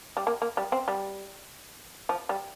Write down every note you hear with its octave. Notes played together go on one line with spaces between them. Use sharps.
G3
A#3
A#3
G3
C4
G3
F3
G3